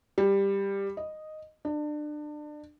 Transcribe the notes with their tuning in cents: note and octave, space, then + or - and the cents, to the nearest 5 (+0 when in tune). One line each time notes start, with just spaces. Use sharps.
G3 +10
D#5 -5
D4 +30